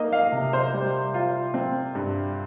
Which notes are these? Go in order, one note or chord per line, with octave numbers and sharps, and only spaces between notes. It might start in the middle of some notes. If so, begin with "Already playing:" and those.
Already playing: A#3 D#4 D#5
F5
C3
C5
G3
F4
C4
G2